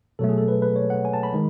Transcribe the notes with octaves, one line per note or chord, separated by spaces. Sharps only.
B2 F#3 A3 A4
G#4
A4
B4
B4
C#5
F#5
G#5
A5
B5
D#3 G#3